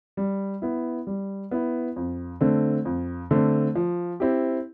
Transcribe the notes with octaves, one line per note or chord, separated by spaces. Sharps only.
G3
B3 E4
G3
B3 E4
F2
D3 A3 C4
F2
D3 A3 C4
F3
C4 E4 G4